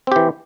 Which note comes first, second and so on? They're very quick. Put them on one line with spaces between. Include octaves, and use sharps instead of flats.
C4 G4 E3